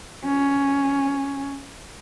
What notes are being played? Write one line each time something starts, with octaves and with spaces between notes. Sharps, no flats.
C#4